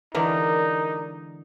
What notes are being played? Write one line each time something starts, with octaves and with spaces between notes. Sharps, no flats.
D3 E3 G#3 D#4 A#4 D5